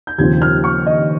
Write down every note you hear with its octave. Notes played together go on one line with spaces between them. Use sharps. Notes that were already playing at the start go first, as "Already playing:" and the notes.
G6
D#2 C#3 F3 C4 G#6
F6
C#6
D#5